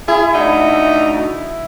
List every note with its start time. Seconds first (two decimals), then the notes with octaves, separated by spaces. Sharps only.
0.08 E4 G#4
0.34 D4 D#4 F#4